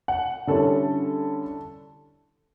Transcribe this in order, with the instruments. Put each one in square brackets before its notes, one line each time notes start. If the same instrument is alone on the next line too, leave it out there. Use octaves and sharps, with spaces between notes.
[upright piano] F#5
D3 G3 C#4 E4 A4